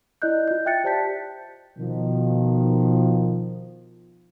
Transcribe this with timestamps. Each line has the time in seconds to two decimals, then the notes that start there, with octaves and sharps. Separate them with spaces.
0.22 E4 D5 D#5 F#6 G6
0.48 F4 G6
0.66 E5 G5 F#6 A6 C#7
0.84 G4 C5 D5 A5 G6 B6
1.79 B2 D#3 F3